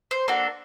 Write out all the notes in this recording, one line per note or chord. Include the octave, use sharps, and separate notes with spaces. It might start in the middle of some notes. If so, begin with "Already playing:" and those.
C5
A#3 D4 F#4 A4